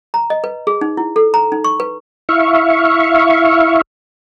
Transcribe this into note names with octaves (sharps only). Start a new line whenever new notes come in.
A#5
D#5
B4
G#4
D#4
E4
A4
A#5
D#4
C#6
B4
E4 E5 F5 C#6